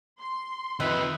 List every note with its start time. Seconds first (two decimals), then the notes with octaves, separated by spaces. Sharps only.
0.20 C6
0.80 F2 D#3 B4 D#5 E5 F#6